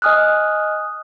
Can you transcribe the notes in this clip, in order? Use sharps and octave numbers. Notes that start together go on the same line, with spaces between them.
D#5 G#5 D#6 F6 F#6